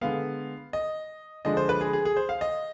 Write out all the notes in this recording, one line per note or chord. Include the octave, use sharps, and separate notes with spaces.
D3 G#3 B3 F5
D#5
D3 F3 G#3 D4 D#5
C5
B4
G#4
G#4
G#4
C5
F5
D#5